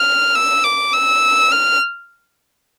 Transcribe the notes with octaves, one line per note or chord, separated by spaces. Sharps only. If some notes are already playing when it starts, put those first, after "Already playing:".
Already playing: F6
E6
D6
E6
F6